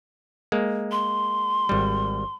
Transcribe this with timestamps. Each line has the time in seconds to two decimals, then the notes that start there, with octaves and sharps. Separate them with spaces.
0.52 G#3 A#3
0.92 C6
1.69 G#1 G3